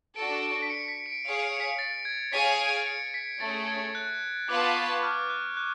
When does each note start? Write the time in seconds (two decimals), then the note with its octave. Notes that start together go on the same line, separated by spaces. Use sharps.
0.16 D4 F#4 A4 D7
0.43 D7
0.62 B6
0.70 C#7
0.88 B6
1.06 D7
1.24 G#4 C#5 F5 D7
1.43 C#7
1.56 C#7
1.60 B6
1.79 A6
2.05 G#6
2.32 G#4 C#5 F5 G#5 B6
2.59 D7
2.87 C#7
3.14 B6
3.40 A3 C#4 G#4 A6
3.68 G#6
3.95 F#6
4.49 B3 F4 B4 F5 A5 D6
4.76 C#6
5.03 F6
5.30 F#6
5.57 F#6